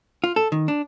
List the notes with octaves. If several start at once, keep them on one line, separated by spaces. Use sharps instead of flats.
F4
A4
D#3
D4